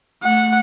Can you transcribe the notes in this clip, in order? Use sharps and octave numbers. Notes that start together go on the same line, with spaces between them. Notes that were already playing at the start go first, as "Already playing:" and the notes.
A3 F#5